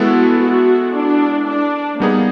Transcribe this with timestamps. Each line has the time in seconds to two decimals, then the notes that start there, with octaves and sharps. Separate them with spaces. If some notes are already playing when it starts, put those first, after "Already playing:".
Already playing: G#3 B3 E4 F#4 A4
0.42 F#4
0.95 D4
1.47 D4
2.00 G3 A#3 B3 D#4 G#4